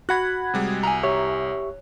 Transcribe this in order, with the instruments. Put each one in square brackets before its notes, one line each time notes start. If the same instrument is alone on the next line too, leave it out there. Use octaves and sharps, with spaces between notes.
[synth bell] F#4 F#5 G#6 [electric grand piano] B5 F#6
[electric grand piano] C3 G3 G#3
[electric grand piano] C2 [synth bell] G#5 A#5
[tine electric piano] G4 E5 C#6 [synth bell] C#5